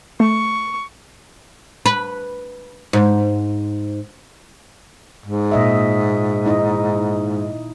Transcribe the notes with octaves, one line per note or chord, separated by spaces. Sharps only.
A3 C#6
B4
G#2
G#2
A#2 D#5 E5
D#4 E4 D#5